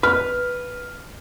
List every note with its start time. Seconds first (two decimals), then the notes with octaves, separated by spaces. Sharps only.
0.03 B4 F6